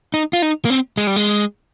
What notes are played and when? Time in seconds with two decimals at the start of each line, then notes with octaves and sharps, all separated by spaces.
0.14 D#4
0.33 F4
0.42 D#4
0.65 A#3
0.70 C4
0.97 G#3
1.07 G3
1.16 G#3